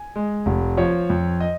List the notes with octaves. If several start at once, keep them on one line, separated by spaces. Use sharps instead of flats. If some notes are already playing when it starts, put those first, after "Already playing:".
Already playing: G#5
G#3
F1
F3 C#5
F2
D#5